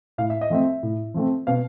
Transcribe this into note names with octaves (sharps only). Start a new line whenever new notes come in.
A2 F5
E5
D#5
F3 A3 C4 E5
A2
F3 A3 C4
B2 F5